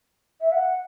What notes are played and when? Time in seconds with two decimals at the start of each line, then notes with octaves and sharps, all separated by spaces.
0.41 E5
0.52 F#5